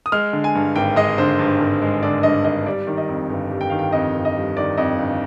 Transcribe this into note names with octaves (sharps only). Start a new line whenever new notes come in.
D#6
G#3 F6
D3
G#5
G2
G#1 G5
G#3 D#5
D3 C5
G2
G#1
G#3
D3 D5
G2 D#5
G#1 D#5
G3 D5
D#3
D#5
F2
G1
G3
G5
D#3 F5
G5
F2 D#5
G1
D#5
G3
D#3 D5
F2 D#5
G1